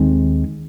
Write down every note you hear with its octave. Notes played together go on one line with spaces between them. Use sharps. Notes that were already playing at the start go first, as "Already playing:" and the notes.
Already playing: D#2 D#3 G#3 C4